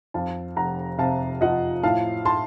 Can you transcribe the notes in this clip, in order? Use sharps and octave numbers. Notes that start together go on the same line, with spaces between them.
F2 F5 A5
F1 F#5 A#5
C3 F5 A5
F3 D#5 F#5
A2 F5 A5
A5 C6